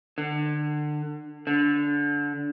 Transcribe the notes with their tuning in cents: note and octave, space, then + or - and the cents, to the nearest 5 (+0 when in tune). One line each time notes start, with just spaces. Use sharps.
D3 +30
D3 -15